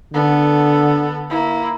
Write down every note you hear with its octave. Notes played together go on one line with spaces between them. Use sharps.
D3 B3 A4
A#3 E4